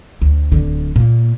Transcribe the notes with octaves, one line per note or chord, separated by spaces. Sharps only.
D2
D1 D3
A#2